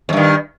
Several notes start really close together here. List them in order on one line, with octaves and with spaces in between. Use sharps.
E2 G2 D#3